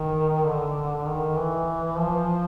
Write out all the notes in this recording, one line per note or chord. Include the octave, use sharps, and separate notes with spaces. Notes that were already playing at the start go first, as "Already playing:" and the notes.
Already playing: D#3
D3
D#3
E3
F3